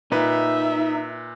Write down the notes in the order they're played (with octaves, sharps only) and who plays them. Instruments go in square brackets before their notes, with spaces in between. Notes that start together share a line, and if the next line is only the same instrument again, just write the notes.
[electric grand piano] A#2 B4 [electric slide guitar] D#4 [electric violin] E5